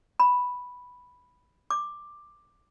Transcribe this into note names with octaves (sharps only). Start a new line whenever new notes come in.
B5
D6